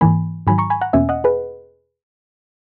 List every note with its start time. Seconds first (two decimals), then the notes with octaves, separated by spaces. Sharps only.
0.01 G#2 E3 A#3 G#5 B5
0.47 G#2 D#3 F#3 G#5 B5
0.58 A#5 C#6
0.70 G#5 B5
0.81 F#5 A#5
0.93 E2 B2 A#3 C#4 E5 G#5
1.09 D#5 F#5
1.24 G#4 B4